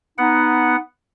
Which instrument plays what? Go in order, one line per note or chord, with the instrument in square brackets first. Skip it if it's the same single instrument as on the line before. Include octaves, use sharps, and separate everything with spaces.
[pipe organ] B3 F#5 [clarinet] D#4